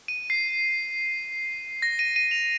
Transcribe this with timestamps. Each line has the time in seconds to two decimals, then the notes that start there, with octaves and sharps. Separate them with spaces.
0.08 D#7
0.30 C7
1.82 A#6
1.99 D#7
2.16 D#7
2.31 F7